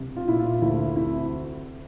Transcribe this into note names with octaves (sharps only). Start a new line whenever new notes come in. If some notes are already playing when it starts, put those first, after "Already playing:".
Already playing: C2
F4
A#2 E4
F4
D2 E4
C3 E4